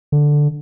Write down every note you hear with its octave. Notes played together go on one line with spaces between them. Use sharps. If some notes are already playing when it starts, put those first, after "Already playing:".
D3